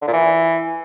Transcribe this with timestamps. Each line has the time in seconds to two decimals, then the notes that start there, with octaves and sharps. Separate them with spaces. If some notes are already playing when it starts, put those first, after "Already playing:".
0.02 D3
0.07 A#2
0.13 E3